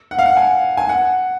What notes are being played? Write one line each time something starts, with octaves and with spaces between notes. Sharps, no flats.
F#5
F5
F#5
G#5
G#5
F#5